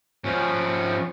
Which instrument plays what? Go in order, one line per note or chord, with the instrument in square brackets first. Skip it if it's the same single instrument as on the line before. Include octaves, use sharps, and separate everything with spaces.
[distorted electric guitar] F3 C#4